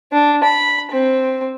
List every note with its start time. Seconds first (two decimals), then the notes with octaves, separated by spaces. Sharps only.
0.12 D4
0.44 B5
0.91 C4